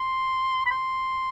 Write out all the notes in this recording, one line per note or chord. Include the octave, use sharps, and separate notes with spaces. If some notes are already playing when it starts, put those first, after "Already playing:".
Already playing: C6
B5
C6